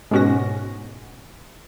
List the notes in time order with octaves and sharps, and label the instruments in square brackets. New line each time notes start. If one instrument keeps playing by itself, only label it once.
[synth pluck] G#2 B2 C#4 F#4 A#6